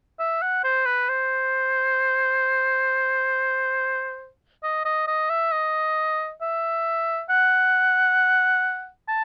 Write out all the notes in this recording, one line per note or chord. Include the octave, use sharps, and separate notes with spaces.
E5
F#5
C5
B4
C5
D#5
D#5
D#5
E5
D#5
E5
F#5
A5